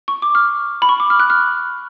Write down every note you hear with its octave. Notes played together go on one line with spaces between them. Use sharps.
C#6
D6
F6
B5
C#6
D6
F6
F#6
F6